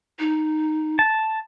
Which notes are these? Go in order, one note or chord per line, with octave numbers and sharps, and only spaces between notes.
D#4
A5